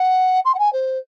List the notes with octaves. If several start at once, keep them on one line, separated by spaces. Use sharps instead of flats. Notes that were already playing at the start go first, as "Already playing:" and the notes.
Already playing: F#5
C6
F#5
G#5
C5